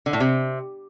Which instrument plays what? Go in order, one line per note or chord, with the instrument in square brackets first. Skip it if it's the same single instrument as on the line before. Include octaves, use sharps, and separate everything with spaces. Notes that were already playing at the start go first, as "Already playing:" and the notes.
[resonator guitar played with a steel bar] D3
A2
C3